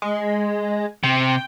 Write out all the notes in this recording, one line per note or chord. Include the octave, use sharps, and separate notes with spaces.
G#3
C3 G5